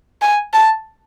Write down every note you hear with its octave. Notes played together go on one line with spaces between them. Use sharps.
G#5
A5